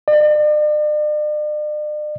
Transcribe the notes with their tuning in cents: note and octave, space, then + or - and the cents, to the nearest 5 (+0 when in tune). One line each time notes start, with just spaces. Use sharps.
D5 +45